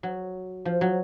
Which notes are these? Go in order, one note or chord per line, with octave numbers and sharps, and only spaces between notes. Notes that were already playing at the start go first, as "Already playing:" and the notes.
F#3
F3
F#3